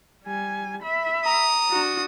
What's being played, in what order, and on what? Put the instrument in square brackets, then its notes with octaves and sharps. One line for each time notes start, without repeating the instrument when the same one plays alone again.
[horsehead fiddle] G3 G#5
E5 B5
[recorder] A#5 [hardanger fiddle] D#6
[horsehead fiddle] D4 F#4